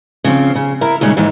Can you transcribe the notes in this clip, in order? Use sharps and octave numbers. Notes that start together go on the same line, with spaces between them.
C#3 F3 C4
C#3
E4 A#4
D#2 A#2 C#3 G3 G#3 C#4
D#2 G#2 E3